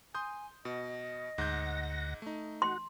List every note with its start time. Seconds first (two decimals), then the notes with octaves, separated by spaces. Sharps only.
0.15 G#5 C6 D#6 G6
0.65 B2 D#5
1.38 D2 G#2 F#5 G6 A#6
2.22 A3 D#4
2.62 F#4 F#5 C6